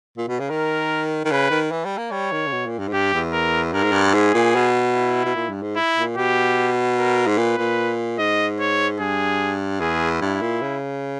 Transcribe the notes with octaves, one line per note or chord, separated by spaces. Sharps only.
A#2
B2
C#3
D#3 A#4
D#3
C#3 B4
D#3
E3
G3
A#3
G3 C#5
D#3
C#3
B2
A#2
G2
G#2
G2 G4
E2
A#4
G2 A#4
G#2
G2
G#2 G#4
A#2
B2
E4
B2
A#2
G2
G#2
E4
A#2
B2 G4
A#4
G#2
A#2 B4
A#2
G#2 D#5
C#5
G2 G#4
E2 G#4
G2 E4
A#2
C#3